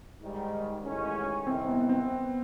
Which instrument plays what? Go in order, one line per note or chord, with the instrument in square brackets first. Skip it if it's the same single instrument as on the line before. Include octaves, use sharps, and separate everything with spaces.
[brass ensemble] G#2 D#3 G3
A1 G#2 D#3 G#3 C#4
[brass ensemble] C2 C3 D#3 [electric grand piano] C4
[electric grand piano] B3
C4